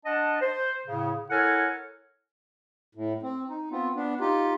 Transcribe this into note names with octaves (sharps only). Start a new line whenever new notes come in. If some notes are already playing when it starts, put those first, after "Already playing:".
D4 D#5 F#5 A5
C5
A2 C#3
E4 A4 A#4 C#5 F#5 G#5
A2
C4
D#4
B3 C4 F4
B3 D4
D#4 F4 G4